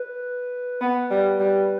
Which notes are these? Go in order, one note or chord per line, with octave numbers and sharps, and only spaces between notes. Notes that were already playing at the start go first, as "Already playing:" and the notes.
Already playing: B4
B3
G3
G3